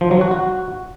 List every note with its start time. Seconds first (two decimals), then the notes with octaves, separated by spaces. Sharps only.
0.01 F3
0.11 F#3
0.21 F#4
0.31 F#4